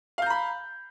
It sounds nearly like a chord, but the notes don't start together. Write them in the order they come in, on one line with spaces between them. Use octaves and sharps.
F5 G6 A#5 B5